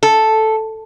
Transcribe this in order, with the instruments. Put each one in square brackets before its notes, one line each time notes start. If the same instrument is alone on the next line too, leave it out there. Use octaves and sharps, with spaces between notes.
[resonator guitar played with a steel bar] A4